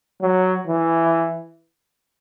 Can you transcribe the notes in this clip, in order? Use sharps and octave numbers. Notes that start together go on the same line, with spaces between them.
F#3
E3